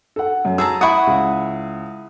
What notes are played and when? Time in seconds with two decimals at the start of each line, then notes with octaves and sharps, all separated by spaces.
0.16 A4 F#5
0.45 F#2
0.58 G#4 A5 A#5 E6
0.81 E4 F#5 C#6 D#6
1.07 C#2